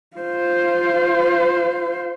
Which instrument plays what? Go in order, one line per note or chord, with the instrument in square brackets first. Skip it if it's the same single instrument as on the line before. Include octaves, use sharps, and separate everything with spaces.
[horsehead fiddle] F4 C5